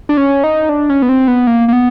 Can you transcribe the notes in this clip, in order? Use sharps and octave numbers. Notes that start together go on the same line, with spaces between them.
D4
C#4
D#4
D4
C#4
B3
C4
B3
A#3
A#3
B3